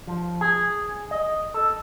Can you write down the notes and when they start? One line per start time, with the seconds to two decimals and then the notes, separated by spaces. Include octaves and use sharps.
0.07 F3
0.41 G#4
1.11 D#5
1.54 A4